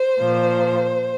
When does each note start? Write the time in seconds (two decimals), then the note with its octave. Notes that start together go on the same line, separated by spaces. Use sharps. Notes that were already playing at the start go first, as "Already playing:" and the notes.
Already playing: C5
0.21 A#2 F3